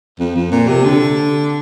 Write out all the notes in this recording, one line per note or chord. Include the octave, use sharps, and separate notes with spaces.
F2
F2
A#2
C3
D3